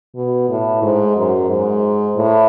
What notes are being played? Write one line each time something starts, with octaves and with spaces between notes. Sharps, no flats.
B2
A2
G#2
F#2
G#2
A2